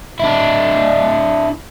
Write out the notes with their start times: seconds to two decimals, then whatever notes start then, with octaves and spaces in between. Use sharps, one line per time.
0.19 D4 E4